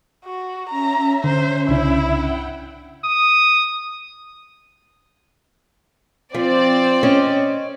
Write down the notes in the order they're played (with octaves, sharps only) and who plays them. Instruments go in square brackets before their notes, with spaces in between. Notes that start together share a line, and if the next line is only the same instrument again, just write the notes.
[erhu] F#4
[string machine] C#4 E5 [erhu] A#5
[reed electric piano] D3 [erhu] C5
[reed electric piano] C2 C#3 D4 [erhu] E4
[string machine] F#5 G5
[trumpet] D#6
[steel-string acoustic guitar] F3 [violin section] C4 D5
[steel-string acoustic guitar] C#4 C#5 D#5